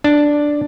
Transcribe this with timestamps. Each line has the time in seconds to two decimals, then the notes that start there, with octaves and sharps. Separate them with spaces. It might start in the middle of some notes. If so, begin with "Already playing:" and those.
0.04 D4